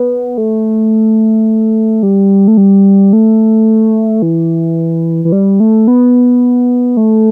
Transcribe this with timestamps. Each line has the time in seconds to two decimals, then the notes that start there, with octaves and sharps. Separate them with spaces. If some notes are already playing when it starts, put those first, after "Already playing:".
Already playing: B3
0.38 A3
2.03 G3
2.48 A3
2.57 G3
3.13 A3
4.22 E3
5.25 E3
5.32 G3
5.60 A3
5.88 B3
6.97 A3